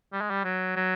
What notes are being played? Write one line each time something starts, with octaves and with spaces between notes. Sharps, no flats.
G3
G#3
G3
F#3
F#3